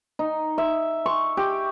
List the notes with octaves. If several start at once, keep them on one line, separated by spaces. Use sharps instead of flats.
D#4
E5
C#6
G4